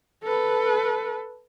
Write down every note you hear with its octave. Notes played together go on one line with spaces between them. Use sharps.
A4 B4